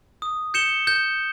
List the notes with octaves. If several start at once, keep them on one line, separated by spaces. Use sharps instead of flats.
D#6
G6 C#7 E7 G7
G6